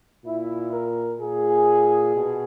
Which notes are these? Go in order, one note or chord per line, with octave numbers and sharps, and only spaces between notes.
A#2 E4
A#4
A#2 G#4
B2